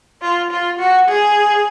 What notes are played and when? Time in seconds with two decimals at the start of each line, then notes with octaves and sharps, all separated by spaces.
0.22 F4
0.51 F4
0.79 F#4
1.08 G#4